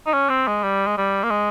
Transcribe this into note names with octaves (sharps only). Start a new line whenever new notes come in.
D#4
C#4
C4
G#3
G3
G#3
G3
A#3
G#3